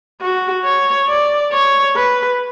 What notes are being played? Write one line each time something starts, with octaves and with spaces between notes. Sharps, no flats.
F#4
C#5
D5
C#5
B4